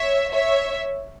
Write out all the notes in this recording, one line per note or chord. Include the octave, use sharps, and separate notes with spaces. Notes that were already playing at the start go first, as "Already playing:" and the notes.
Already playing: C#5 E5
C#5 E5